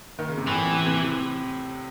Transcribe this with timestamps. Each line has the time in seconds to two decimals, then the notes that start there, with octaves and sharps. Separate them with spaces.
0.19 D#3
0.28 C#3
0.37 C3
0.47 A2 E3
0.67 C3
0.86 C3